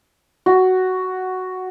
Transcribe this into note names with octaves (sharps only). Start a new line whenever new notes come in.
F#4